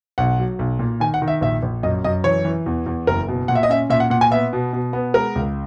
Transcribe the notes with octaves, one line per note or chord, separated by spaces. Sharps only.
B1 F#5
F#3
B1
A#2
D#3 G#5
F#5
D#3
E5
A#1 E5
A#1
F#2 D#5
F#2 D#5
E3 C#5
E3
E2
E2
F#1 A#4
B2
A#2 F#5
E5
D#5
C#4 E5
A#2 E5
F#5
A#2 F#5
G#5
B3 E5
B2
B2
B3
G#3 A#4
C#2